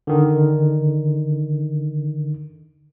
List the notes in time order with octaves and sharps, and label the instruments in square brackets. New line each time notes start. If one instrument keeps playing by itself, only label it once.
[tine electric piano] D3 D#3